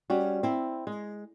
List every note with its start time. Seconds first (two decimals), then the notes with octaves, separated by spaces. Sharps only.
0.10 G3 C#4 F#4
0.43 C4 E4
0.87 G#3